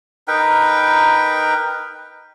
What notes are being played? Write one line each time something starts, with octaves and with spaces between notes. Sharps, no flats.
D#4 A#4 B4 G5